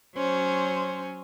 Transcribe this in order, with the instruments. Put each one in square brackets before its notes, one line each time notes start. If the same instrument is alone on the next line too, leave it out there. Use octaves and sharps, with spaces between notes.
[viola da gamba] F#3 C#4 [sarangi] C5